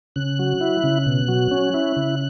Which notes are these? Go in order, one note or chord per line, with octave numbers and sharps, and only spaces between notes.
C#3 F#6
F#3
E4
C#3
B2
F#3
C#4
E4
C#3